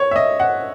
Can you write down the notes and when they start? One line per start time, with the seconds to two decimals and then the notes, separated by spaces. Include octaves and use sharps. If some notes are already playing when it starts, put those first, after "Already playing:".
Already playing: C#5
0.11 E5
0.16 D#5
0.40 F#5